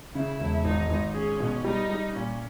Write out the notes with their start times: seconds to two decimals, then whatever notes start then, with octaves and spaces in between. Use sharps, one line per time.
0.15 C#3 E4
0.40 E1
0.64 G#1 D#4
0.89 G#1
1.14 C#4 G#4
1.40 B2
1.65 G3 D#4
1.90 G3
2.15 A#2 C#4